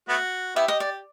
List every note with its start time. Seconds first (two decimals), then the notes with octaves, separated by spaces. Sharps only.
0.09 A3 B3 F#4
0.56 B3 E4 G4 E5
0.68 D#5
0.80 D5